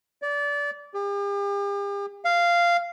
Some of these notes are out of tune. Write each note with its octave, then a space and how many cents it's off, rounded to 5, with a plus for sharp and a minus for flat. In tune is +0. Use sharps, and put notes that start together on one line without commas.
D5 -25
G4 +45
F5 -10